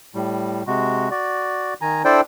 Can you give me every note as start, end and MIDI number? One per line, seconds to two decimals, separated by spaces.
0.15 0.63 45
0.15 0.63 55
0.67 1.09 48
0.67 1.09 56
0.67 1.09 66
1.11 1.74 66
1.11 1.74 74
1.81 2.02 51
1.81 2.02 80
1.81 2.02 82
2.05 2.21 62
2.05 2.21 64
2.05 2.21 69
2.05 2.21 72
2.05 2.21 74
2.05 2.21 79